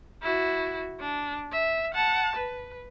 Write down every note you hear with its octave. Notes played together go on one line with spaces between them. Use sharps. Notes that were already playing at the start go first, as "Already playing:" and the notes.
E4 F#4
D4
E5
F#5 A5
B4